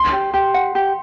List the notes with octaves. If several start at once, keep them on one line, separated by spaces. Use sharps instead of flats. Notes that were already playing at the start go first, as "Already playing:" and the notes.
Already playing: C6
G4
G4
F#5
G4